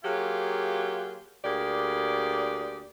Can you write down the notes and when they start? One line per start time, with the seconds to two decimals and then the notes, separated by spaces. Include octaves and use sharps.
0.04 F#3 A#3 F4 G4 G#4
1.44 D2 A#3 G4 G#4 D5